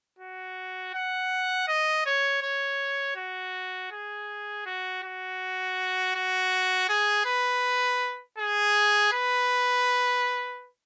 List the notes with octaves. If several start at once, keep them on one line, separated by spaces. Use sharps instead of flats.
F#4
F#5
D#5
C#5
C#5
F#4
G#4
F#4
F#4
F#4
G#4
B4
G#4
B4